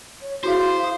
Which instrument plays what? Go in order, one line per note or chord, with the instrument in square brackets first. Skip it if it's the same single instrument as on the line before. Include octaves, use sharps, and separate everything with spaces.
[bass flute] C#5
[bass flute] E4 [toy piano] F#4 G#4 F5 [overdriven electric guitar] C5
[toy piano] F5 D#6